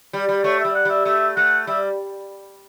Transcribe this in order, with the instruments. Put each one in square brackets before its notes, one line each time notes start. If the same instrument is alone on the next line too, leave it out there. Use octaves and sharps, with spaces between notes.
[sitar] G3
G3
[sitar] A3 [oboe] C#5
[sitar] G3 [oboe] E5
[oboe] F#5
[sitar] G3 [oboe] E5
[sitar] A3 [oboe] E5
[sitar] A3 [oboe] F#5
[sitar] G3 [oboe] E5